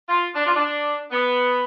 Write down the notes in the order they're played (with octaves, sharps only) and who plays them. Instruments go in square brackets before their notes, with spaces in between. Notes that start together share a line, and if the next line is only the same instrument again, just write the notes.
[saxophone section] F4
D4
F4
D4
B3